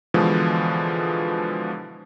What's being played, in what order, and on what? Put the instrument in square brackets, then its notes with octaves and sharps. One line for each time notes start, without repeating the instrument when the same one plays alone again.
[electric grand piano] B2 D3 E3 F3 G#3